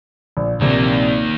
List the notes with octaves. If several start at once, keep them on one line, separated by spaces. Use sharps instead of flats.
A#1
A#1 C3 D#3 A#3